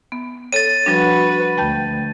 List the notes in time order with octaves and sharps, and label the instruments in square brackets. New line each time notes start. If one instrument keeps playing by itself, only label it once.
[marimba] B3
[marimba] A4 C#5 [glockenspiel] A6 D#7
[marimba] F3 G3 D4 [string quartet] F#4 B4 F#5
[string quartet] D2 [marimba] G5 A5 G6